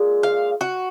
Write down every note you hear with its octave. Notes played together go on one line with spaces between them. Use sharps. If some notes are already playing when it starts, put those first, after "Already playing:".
Already playing: A#2 G#3
F5
F#4